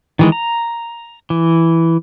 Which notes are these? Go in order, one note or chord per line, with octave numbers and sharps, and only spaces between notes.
D#3 E3 G#3
A#5
E3